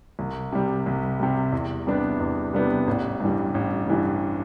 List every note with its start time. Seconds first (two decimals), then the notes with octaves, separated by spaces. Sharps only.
0.19 C2
0.52 C3 G3
0.86 C2
1.20 C3 G3
1.52 E2
1.87 C3 G3 B3 D4
2.20 E2
2.54 C3 G3 B3 D4
2.87 A1
3.20 G2 E3 G3
3.54 A1
3.88 G2 E3 G3